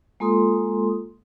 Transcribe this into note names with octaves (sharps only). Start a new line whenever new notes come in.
G#3 A#3 F4 A4 C6 D#6